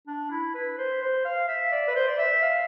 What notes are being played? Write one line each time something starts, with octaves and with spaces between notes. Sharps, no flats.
D4
E4
B4
C5
C5
F5
E5
D5
B4
C5
D5
E5
F5